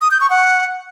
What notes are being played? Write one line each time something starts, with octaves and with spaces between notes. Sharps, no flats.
D#6
G6
C#6
F#5